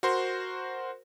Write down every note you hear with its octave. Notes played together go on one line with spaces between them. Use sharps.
F#4 A#4 C5 C6